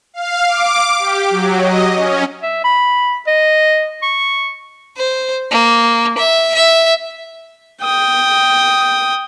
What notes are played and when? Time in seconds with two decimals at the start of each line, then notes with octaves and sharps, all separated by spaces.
0.14 F5
0.48 D6
0.99 G4
1.30 F#3
1.61 D#5
1.95 C#4
2.42 E5
2.64 B5
3.27 D#5
4.02 C#6
4.97 C5
5.51 A#3
6.18 E5
6.55 E5
7.83 G5 D#6